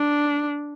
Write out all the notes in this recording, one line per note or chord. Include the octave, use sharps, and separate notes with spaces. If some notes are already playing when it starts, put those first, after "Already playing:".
Already playing: D4